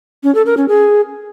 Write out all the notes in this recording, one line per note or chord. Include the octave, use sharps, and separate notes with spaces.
C#4
A4
A#4
C#4
G#4